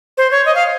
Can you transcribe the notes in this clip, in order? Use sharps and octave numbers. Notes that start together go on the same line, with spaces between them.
C5
C#5
D#5
F5